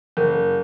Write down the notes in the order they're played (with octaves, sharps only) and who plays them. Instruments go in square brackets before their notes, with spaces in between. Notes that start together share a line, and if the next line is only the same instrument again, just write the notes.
[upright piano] F#1 [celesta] A#4